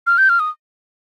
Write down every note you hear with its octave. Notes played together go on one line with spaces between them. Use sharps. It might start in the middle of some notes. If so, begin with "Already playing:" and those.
F6
G6
F6
D#6